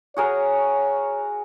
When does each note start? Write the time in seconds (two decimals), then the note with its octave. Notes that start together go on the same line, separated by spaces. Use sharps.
0.17 F#4 G#4 A#4 C#5